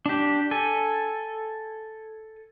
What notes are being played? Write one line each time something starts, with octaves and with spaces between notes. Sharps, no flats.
D4 G4
A4 G#5